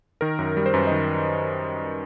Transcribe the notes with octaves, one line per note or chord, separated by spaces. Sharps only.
D#3 A#4
F#2
G3
C5
F#2 B4
D#5
D#3